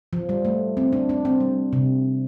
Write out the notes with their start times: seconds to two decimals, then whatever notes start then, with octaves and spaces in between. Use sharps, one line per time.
0.13 F3
0.29 G3
0.45 A3
0.77 C4
0.93 D4
1.09 D4
1.25 C4
1.40 G3
1.73 C3